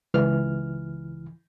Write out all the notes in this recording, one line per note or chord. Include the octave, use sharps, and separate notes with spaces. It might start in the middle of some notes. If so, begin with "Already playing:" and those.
C#2 E3 F6